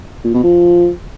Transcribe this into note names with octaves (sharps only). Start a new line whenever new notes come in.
A#2
B2
F3